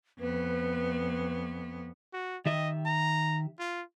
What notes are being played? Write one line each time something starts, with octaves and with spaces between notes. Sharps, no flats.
F2 B3 B4
F#4
D#3 G4 D#5 E5
A#5
F4